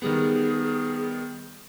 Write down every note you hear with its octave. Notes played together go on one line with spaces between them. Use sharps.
D#3 G3 B3 G#4